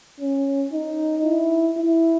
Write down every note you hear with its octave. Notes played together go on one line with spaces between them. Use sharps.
C#4
D#4
E4
E4